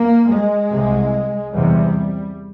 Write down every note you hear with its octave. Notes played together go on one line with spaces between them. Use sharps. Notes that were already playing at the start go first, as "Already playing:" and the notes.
Already playing: A#3
G#3
C2 C3
E2 C3 G3